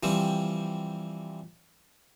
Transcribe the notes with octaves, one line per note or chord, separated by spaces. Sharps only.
E3 F3 G3 C4